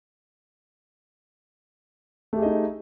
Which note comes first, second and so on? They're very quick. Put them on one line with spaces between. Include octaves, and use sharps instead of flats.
A3 G4 G#4 D#5 D#4